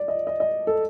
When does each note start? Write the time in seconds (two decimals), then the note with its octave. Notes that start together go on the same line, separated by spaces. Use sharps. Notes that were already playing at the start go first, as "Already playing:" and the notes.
Already playing: D5
0.08 D#5
0.27 D#5
0.40 D#5
0.67 A4